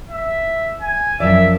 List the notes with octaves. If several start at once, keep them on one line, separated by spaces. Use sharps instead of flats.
E5
G#5
F#2 F3 D5 E5